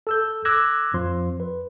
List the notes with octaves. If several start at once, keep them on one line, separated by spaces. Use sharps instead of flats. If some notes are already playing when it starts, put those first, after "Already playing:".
A4 E6 G6
D6 E6 F#6 G#6 A#6
F2 F3 C6
B4